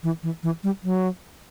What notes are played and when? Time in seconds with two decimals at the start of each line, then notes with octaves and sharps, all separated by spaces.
0.03 E3
0.23 E3
0.43 E3
0.63 G3
0.84 F#3